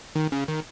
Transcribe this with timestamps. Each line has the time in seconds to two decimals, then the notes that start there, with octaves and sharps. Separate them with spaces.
0.15 D#3
0.32 C#3
0.48 D#3